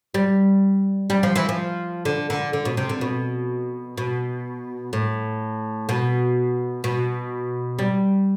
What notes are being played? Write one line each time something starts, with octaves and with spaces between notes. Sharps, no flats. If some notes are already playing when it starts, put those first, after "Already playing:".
G3
G3
F3
E3
F3
D3
D3
D3
B2
C3
D3
B2
B2
A2
B2
B2
G3